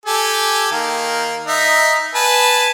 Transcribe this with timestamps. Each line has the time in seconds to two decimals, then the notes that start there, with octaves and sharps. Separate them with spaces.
0.06 G4 A4 G#5
0.72 D#3 A#3
1.47 D#4 E5
2.15 B4 G#5 A5